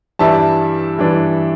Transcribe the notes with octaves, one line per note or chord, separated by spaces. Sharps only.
G2 E3 G3 D4 E5 A5
G2 E3 G3 D4